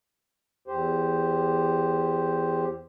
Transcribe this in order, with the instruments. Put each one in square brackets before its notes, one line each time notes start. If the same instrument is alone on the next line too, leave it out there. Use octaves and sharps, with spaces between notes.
[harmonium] E2 G4 C5